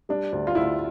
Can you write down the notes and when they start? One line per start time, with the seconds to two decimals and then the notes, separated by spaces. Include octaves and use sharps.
0.09 G3 D4
0.32 D2
0.47 F4
0.55 D2 E4